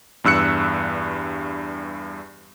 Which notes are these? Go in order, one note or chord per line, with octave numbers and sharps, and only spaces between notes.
E2 G2 E6 F#6 C#7